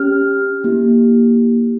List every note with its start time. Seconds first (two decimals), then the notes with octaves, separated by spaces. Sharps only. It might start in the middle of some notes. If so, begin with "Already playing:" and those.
Already playing: C#4 G4 F6
0.64 A#3 E4 G4